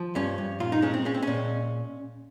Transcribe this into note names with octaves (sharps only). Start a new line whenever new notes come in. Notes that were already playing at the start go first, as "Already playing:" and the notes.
Already playing: F3
G2 C#4
G2
A#2 F4
D#4
G#3 C#4
C4
G#3 C#4
C4
A#2 C#4